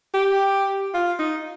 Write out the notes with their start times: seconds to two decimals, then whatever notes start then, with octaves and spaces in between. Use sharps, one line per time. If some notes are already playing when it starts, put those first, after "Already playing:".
0.14 G4
0.94 F4
1.19 D#4